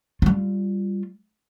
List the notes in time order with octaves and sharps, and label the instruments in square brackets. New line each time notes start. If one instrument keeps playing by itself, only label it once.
[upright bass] G3 F4